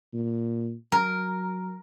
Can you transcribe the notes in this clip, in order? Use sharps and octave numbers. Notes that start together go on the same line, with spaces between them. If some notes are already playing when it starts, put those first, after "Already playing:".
A#2
F#3 A#4